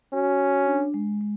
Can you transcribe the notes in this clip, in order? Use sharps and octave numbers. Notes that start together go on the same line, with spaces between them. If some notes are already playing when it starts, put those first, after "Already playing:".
C#4 F#4
F#4
D4
G#3
G#3